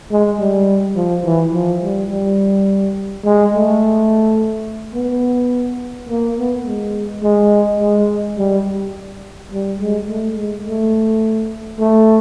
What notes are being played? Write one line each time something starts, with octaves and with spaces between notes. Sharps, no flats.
G#3
G3
F3
E3
F3
G3
G3
G#3
A3
B3
A#3
B3
G#3
G#3
G#3
G3
G3
G#3
A3
G#3
A3
A3